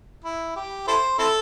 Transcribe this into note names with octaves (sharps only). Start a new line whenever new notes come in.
E4
G4
E4 A4 C5
C4 E4 A4